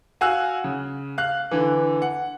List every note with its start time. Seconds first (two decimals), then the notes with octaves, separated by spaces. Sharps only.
0.21 F#4 F5 G#5 E6 F#6
0.64 C#3
1.18 F5 F#6
1.51 D3 E3
2.02 F#5